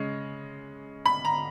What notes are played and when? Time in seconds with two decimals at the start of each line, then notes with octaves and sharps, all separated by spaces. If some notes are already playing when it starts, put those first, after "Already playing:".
Already playing: C#3 G#3 C#4
1.06 B5
1.25 A#5